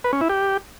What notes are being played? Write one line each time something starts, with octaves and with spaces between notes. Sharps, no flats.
B4
C#4
E4
G4